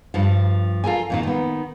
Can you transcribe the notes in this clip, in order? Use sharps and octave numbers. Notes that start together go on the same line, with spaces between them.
G2 F3
F4 A4 A#4 G#5
F2 A#2 D#3
D#3 B3